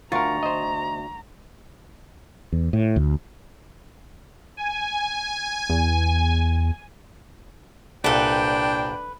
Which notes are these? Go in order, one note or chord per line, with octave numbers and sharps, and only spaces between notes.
D2 F4 A#4 A#5 C#6 A6
C5 D#5
E2
A2
D2
G#5
E2
C2 A#2 D4 A4 B4 G5